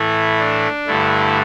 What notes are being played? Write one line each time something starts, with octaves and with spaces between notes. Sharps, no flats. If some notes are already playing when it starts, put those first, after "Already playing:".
Already playing: A2 E3 A3 E4
D4
G2 D3 A3 E4